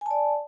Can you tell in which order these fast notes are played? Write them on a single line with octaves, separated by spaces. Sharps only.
G#5 A5 D5